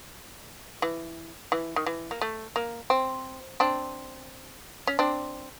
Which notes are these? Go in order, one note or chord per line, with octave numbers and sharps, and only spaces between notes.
E3
E3
D#3
E3
A#3
A3
A#3
C4
C4 D4
C#4
C4 D4